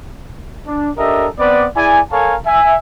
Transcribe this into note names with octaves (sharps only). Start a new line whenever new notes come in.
D4
D4 G4 A4 A#4 D#5 E5
B3 C4 B4 D5
E4 G#4 D5 G#5
A4 A#4 C#5 F5 G#5 A5
E5 G#5